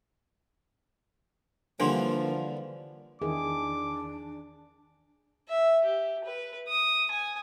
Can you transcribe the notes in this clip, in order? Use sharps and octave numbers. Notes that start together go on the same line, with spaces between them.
D3 E3 F3 G3 A#3 D4 C#5 C6
E2 D#3 E3 D4 G#4 D6
E5
G4
B4
D#6
G#5